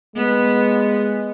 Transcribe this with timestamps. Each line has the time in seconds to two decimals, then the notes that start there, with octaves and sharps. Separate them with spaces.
0.16 G#3 B3